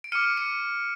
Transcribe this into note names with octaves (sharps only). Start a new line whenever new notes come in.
D7
D6 F6 C#7 D#7
C#7 D#7